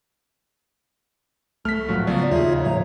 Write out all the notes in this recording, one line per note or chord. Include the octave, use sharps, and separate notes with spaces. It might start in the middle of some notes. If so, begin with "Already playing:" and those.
C2 A3 F6 B6
A2 F3 F#3 F#4
C#3 F3 F#3 B3 D5
D#2 D#4 F4 G#4 C#5 E5
C#3
A2 F3 C#5 A#5